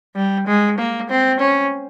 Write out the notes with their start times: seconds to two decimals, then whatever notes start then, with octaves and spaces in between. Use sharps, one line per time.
0.15 G3
0.47 G#3
0.78 A#3
1.10 C4
1.40 C#4